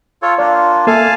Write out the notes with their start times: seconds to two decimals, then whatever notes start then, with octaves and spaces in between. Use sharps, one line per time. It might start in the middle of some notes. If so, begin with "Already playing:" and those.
0.22 F4 A4 C#5
0.38 A#3 D4 F4 D5
0.87 A#3 A4 E5 F5 G#5 A5